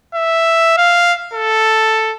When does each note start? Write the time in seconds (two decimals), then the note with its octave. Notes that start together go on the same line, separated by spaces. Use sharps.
0.15 E5
0.78 F5
1.34 A4